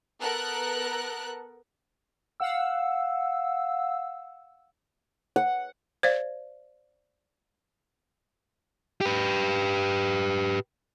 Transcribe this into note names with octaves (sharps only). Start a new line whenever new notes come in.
B3 A4 A#4 F#6
F5 F#5 E6
F#5
C5 D5 F5
G4 B4